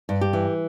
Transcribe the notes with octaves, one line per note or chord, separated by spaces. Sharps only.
G2
G4
E3